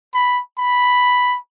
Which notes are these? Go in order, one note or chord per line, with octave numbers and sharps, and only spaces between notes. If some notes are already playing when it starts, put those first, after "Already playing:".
B5
B5